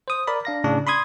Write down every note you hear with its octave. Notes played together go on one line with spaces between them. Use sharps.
C5 D#6
A#4 D5 B5
D4 F5 A#6
A2 C#3 D4
B5 C6 D#6 G#6